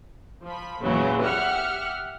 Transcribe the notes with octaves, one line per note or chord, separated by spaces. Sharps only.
F3 B5
E2 A#2 C#3 E3 F#3 G#3
G4 E5 F#5 F6 C#7